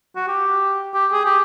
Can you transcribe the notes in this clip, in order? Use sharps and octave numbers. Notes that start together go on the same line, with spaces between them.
F#4
G4
G4
G#4
G4